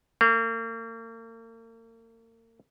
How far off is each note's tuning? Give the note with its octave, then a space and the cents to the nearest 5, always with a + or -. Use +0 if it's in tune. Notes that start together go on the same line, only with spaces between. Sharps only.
A#3 -40